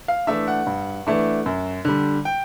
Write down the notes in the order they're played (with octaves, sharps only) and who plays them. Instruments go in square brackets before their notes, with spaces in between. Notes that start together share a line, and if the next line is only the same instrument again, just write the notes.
[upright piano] F5
E3 A3 D4 E5
F#5
G2
E3 A3 D4
F#2
D3 G3
G5